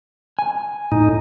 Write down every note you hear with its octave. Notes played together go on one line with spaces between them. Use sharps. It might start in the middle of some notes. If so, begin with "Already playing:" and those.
G#5
A2 D#4